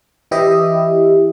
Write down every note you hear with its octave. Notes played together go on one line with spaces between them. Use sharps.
E3 E4 G4 D#5 E5